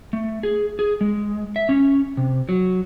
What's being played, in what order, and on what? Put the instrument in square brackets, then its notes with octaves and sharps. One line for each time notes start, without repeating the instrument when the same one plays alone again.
[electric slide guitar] A3
G#4
G#4
G#3
E5
C#4
C3
F#3